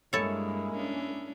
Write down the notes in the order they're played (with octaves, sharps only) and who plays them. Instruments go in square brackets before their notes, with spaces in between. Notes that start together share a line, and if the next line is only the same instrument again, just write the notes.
[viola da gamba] G2 [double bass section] G#3 A#3 [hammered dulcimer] E4 [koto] A4 C#5
[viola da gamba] C#4 D4